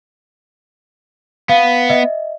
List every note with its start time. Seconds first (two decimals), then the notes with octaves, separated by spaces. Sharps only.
1.49 B3 F5
1.90 D#5 E5